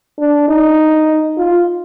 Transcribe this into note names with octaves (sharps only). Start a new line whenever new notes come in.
D4
D#4
F4